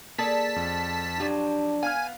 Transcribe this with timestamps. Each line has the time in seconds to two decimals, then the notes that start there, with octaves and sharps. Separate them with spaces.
0.18 A#3 G#4 A4 D5 A5 B6
0.56 F2
1.20 F3 F#3 D4 G4
1.83 B3 F5 G#5 F6